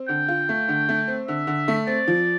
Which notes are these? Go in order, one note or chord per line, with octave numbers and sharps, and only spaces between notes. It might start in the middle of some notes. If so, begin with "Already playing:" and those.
Already playing: C4
D3 G5
F4
A3
D3
A3
C4
D3 E5
D3
A3
C4 D5
F3